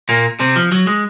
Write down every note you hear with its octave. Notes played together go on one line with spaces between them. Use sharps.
A#2 A#3
C3 C4
F3
F#3
G#3